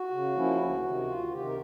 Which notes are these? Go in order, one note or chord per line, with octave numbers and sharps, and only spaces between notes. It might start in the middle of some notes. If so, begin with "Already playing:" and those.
Already playing: F#4
C#3
F3 A#3 C#4 E4
D2
C3 D#3
D2 F4
C3 D#3 G4
A#4